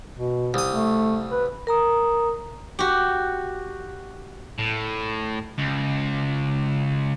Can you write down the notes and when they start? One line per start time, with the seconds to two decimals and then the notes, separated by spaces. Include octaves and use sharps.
0.17 B2
0.54 C2 D#6
0.71 A3
1.32 B4
1.67 A#4 A#5 D#6
2.79 F#4 G4
4.58 A2
5.59 C#2